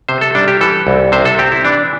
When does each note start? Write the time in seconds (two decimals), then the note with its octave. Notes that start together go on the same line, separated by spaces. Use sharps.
0.09 C3 C5
0.21 A4
0.35 G3 D4
0.48 G4
0.61 E3 A4
0.87 C2
1.12 C3 C5
1.25 A4
1.38 C4 G4
1.52 E4
1.65 E3 D4